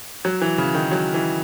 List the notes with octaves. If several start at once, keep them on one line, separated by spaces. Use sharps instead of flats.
F#3
E3
C#3
D#3
F#3
E3